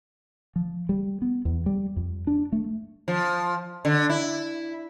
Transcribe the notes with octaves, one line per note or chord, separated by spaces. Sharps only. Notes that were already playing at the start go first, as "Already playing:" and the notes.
F3
G3
B3
E2
G3
F2
D4
A3
F3
D3
E4